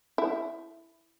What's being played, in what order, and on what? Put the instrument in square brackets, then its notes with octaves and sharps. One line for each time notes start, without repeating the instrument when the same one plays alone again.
[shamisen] E4